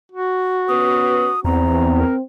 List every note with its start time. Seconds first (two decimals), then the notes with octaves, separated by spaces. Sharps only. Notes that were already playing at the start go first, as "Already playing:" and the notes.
0.12 F#4
0.69 B3 C#4 B4 D#6
1.45 E2 C4 A#5
1.96 A#4